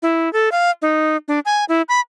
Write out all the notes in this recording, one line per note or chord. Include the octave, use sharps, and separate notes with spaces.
E4
A4
F5
D#4
D4
G#5
E4
B5